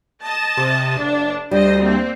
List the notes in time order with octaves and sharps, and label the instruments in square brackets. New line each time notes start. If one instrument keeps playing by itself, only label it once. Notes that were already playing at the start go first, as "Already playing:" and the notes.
[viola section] D#5 A5
[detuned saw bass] C3
[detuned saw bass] F#1 [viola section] D4
[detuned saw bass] D2 [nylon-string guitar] G3 [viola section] C5 D#5
[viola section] A#3 C4